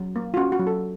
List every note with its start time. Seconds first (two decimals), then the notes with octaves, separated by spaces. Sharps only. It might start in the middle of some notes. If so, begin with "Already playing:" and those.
Already playing: F#3
0.16 A#3
0.34 F4
0.37 C#4 F#4
0.52 F#4
0.59 F#3
0.67 A4